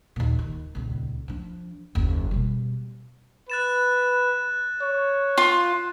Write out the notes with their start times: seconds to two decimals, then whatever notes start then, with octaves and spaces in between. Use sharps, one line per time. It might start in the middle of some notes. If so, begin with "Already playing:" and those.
0.16 D#2 A#2
0.39 D#3
0.75 D#1 C#2
1.28 F3 D4
1.95 F#1 D#2
2.31 B2 G3
3.50 B4 F#6 A6 E7
4.81 C#5
5.38 F4